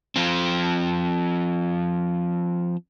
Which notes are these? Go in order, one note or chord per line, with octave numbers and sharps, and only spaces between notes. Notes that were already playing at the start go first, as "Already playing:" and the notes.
F3 C4